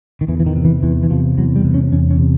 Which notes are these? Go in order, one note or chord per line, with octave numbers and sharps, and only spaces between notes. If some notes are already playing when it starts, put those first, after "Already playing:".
D#3
E2 E3
E3
D#3
C3
E3
E2 E3
E3
C3 F3
E2 F#3
G3
C3
C#4
E2 C#4
C#4
C3